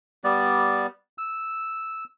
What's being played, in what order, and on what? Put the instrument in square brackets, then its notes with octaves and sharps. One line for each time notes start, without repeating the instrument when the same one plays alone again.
[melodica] G3 B3 D5
E6